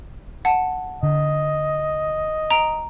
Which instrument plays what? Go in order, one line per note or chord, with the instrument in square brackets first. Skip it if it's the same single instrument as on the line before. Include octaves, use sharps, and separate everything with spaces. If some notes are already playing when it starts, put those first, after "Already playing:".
[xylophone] F#5 A5
[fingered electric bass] D3 [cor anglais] D#5
[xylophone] A#5 D7